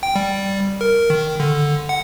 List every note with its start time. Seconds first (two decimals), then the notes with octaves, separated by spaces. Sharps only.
0.03 G5
0.16 G3
0.81 A#4
1.10 D#3
1.40 D3
1.89 F#5